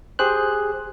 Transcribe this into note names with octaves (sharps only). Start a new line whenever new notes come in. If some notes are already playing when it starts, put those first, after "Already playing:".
G4 G#4 C5 F#6